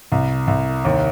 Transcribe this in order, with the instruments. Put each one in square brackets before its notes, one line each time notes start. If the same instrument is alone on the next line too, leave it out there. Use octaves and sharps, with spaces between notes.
[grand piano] C2
C2
D#2